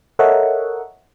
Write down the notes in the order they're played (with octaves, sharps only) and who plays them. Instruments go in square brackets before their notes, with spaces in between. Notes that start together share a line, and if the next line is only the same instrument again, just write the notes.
[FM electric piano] A4 A#4 C#5 D#5 E5 F#5